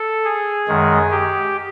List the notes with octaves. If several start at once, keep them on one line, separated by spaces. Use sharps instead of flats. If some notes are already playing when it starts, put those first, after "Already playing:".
Already playing: A4
G#4
F#2 D#3 G#3
G4